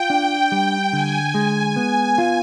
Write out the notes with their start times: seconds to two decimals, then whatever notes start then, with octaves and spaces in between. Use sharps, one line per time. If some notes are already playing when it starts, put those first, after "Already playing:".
Already playing: F4 G5
0.10 D4
0.52 G3
0.93 D3 G#5
1.34 G#3
1.76 B3
2.18 F4